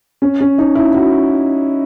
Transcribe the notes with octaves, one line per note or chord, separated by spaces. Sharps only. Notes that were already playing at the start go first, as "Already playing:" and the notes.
C#4
C#4
D#4
E4
F#4